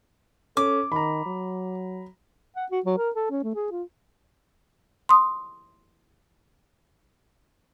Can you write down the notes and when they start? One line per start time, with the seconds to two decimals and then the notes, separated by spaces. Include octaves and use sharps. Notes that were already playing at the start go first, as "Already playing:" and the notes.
0.57 C#4 A4 D6
0.92 D#3 A#5 B5
1.26 F#3
2.56 F#5
2.71 F#4
2.85 F#3
2.98 A#4
3.16 A4
3.30 C#4
3.44 A3
3.55 G#4
3.71 F4
5.09 C6 D#6